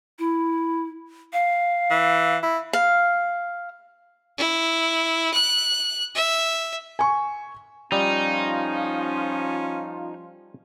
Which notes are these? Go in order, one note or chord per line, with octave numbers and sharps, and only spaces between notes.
E4
F5
E3
E4
F5
E4
F#6
E5
G#5 C#6
F3 G3 C#4 D#4 F4